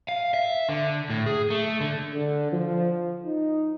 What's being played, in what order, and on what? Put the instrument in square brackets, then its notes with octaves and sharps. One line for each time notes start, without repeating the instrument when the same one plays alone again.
[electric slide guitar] F5
E5
D3
A2
G#4
A3
D3
[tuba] D3
F3
[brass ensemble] D#4